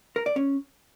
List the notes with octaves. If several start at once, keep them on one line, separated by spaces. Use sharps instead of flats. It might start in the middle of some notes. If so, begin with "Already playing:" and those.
A#4
D5
C#4